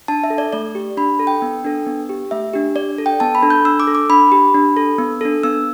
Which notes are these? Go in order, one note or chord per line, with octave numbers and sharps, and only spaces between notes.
D4 A5
E5
A4
D5
A3 D5
G4
D4 B5
A4
G5
B3
D4 A4
B3
G4
A3 E5
D4 G4
D4 D5
A4
G5
B3 A5
B5
D4 A4
G6
D4 E6
D6
A4
D6
D4 B5
G4
D4
A4
B3
D4 A4
B3 E6